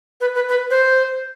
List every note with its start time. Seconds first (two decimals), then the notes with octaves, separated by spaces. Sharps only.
0.21 B4
0.35 B4
0.49 B4
0.71 C5